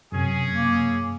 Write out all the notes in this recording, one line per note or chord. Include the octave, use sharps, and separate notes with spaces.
F#2 C3 C#4 G#4
A#3